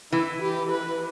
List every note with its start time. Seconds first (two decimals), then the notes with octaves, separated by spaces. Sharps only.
0.12 E3 E4
0.42 G4
0.71 B4